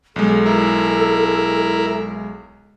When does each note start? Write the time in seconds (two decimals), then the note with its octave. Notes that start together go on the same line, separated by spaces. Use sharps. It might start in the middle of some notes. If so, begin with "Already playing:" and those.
0.16 B1 G#3 A4
0.46 E4 A#4